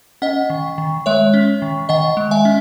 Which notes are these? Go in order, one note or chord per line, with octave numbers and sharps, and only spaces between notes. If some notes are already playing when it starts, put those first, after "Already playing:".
C#4 D#5 F#5
D#3
D#3
G#3 C#5 E5
C#4
D#3
D#3 D#5 F#5
G#3
E5 G#5
C#4